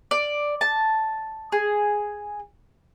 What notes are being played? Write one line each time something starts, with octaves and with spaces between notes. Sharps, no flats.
D5
A5
G#4